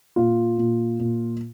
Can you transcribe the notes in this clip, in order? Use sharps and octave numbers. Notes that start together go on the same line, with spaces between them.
A#2 F4
A#2
A#2